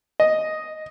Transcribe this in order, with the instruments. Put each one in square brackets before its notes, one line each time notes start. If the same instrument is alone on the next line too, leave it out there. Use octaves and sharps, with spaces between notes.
[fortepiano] D#5